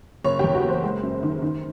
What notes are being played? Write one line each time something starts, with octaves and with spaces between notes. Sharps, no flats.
F#1 C#5
E2 G4
F#4
F#1
C5
G#3
F#2
D#3
D#3